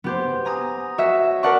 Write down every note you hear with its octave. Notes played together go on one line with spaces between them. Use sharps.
B3 G4 C5
G#5 A#5 D#6
F#4 C#5 D#5 E5
A#4 B4 D5 F#5 A5 C#6